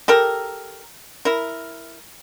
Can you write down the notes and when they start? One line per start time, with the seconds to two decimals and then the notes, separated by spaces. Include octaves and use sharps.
0.08 G4 A4 A#4
1.25 E4 A#4